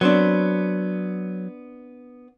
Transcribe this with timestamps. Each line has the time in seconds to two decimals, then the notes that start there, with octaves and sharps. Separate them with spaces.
0.01 F#3 B3 C4 D4